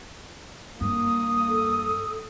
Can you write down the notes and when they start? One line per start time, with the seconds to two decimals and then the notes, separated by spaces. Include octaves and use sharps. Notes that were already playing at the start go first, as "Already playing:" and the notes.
0.81 G2 A#3 D4 D#6
1.49 A4